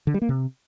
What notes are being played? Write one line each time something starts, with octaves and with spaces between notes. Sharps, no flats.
D3
G3
A#3
C3